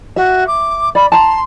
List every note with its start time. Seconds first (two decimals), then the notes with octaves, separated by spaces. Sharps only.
0.16 F#4 E5
0.47 D6
0.95 D5 B5
1.12 A5 A#5 C6